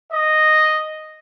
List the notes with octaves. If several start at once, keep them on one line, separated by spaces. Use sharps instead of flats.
D#5